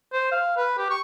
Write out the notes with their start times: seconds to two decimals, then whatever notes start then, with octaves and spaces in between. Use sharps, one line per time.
0.12 C5
0.31 F5
0.57 B4
0.78 G4
0.90 C#6